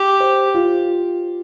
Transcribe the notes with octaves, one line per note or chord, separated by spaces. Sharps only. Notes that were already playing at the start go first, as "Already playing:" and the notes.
Already playing: G4
C5
F4